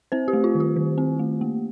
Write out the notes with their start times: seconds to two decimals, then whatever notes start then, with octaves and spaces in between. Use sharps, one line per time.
0.12 C4 C5
0.28 G4
0.33 A3
0.44 F4
0.55 D#3
0.60 G4
0.76 D#3
0.98 C4
1.19 A3
1.41 A#3